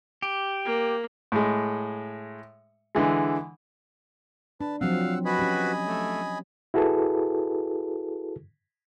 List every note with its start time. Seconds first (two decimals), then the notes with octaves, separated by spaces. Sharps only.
0.22 G4
0.65 A#3
1.32 A2 G#3
2.95 D3 E3 G#3
4.61 D4 B4 A5
4.81 F3 F#3 C4 F5 F#5 E6
5.25 F#4 B4 D#5 G#5 B5
5.39 C#4 G4
5.86 A3
6.74 E4 F#4 G#4 A4 B4